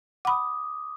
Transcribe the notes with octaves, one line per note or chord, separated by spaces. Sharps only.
F#5 B5 D6 D#6